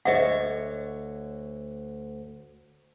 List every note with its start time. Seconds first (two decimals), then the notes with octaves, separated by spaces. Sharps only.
0.05 D2 C#5 D#5 E5 F#5